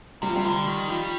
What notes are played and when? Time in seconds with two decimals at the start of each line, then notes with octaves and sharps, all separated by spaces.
0.22 C3 G3
0.29 F3
0.36 G3
0.45 D3
0.67 D#3
0.90 F3 G3